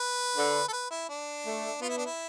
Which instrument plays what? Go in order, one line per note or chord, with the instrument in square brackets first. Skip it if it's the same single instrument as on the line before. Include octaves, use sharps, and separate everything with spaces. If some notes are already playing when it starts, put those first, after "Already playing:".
Already playing: [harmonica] B4
[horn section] D3
[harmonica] A4
B4
E4
D4
[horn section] A3
[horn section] B3 [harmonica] F4
[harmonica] E4
D4
E4